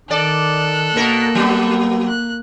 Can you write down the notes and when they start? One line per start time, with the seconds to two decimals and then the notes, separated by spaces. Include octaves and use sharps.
0.11 D#3 A4 D5 F#6
0.96 B2 A#3 A#4
1.35 F#3 B3
2.08 F#6